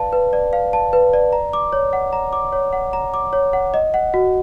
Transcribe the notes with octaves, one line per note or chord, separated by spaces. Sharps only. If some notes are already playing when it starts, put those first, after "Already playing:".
Already playing: B4 D5 F5 A5
B4
D5
F5
A5
B4
D5
A#5
D6
C#5
F#5
A#5
D6
C#5
F#5
A#5
D6
C#5
F#5
D#5
F#5
F#4